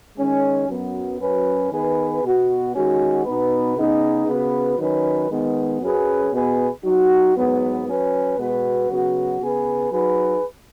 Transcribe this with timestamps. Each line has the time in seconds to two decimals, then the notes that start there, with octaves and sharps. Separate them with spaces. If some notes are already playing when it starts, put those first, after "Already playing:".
0.17 D#3 G#3 C#4
0.69 F#2 F#3 B3
1.20 F#2 F#3 C#4 B4
1.72 D#3 B3 G#4 B4
2.23 B2 B3 F#4
2.74 D#3 G#3 C#4 F#4
3.25 B2 B3 D#4 B4
3.77 C#3 B3 D#4 G#4
4.28 C#3 B3 F#4 B4
4.79 D#3 F#3 C#4 B4
5.30 D#3 G#3 B3
5.81 F#2 F#3 C#4 G#4 B4
6.33 B2 B3 G#4 B4
6.84 F#3 D#4 F#4
7.36 G#2 F#3 B3
7.87 F#3 C#4 B4
8.38 B2 G#3 B3 F#4 B4
8.89 C#3 F#3 B3 F#4
9.41 C#3 B3 G#4 B4
9.92 F#3 D#4 G#4 B4